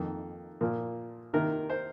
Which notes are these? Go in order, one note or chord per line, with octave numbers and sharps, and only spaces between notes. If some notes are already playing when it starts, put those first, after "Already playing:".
Already playing: F2 D#3 A#3
A#2 F3 A#3
C3 D#3 A#3 A#4
C5